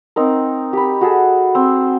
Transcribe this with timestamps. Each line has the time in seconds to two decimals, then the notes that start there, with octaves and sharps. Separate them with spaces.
0.16 C4 D#4 A#4
0.73 G4 B5
1.01 F#4 G#4 A4
1.55 C4